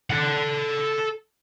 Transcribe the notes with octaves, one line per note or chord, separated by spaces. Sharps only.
A4 F#5